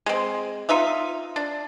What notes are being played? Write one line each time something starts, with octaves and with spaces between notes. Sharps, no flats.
G#3 C4
D#4 F4 E5 F5
D4